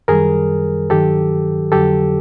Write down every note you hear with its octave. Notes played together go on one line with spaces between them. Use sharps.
F#2 D#3 G3 G#4 A#4
G2 D#3 F#3 G4 A4
F2 D3 F#3 G4 A4